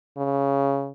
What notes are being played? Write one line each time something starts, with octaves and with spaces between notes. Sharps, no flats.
C#3